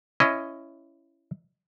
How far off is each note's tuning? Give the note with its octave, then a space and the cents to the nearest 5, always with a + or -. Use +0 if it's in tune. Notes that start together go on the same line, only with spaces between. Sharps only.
C#4 +0 E4 +15 D#5 +0